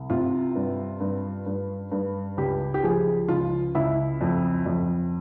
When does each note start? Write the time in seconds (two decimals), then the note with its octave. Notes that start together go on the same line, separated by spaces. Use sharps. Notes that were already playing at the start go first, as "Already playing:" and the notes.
Already playing: C2
0.10 C3 F4
0.55 G2
1.00 G2
1.46 G2
1.91 G2
2.37 C#2 G4
2.74 G4
2.83 F3 G#4
3.28 C#2 F4
3.75 C#2 E4
4.21 F2
4.66 F2